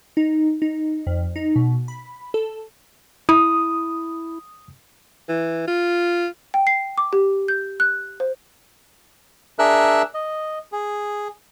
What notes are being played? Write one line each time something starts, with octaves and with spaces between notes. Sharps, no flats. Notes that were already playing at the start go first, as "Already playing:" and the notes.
D#4
D#4
F2
D#4
B2
B5
A4
E4 D#6
E3
F4
G5
C7
D6
G4
G6
F#6
C5
D4 G#4 A#4 E5 E6 F#6
D#5
G#4